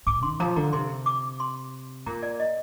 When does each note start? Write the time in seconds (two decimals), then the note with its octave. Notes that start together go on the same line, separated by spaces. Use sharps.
0.06 G#2 D6
0.23 D#3 C6
0.40 F3 A#5
0.56 D3 A#5
0.73 C3 C6
1.06 D6
1.40 C6
2.06 A#2 A#5
2.23 D5
2.40 D#5